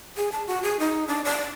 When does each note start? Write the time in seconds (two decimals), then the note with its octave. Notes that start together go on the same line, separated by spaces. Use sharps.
0.17 G#4
0.32 A5
0.47 F#4
0.63 G#4
0.80 D#4
1.08 D4
1.25 D5